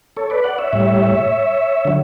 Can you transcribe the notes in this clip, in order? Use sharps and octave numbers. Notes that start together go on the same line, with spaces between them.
A4 C#5
B4 D5
D5 F#5
C#5 E5
A2 G3
D3 F#3